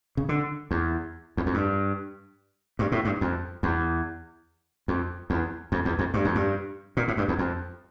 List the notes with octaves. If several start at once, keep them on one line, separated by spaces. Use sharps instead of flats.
C#3
D3
E2
E2
F2
G2
G2
A2
G2
F2
E2
F2
E2
F2
E2
F2
G2
F2
G2
A#2
A2
G2
E2
F2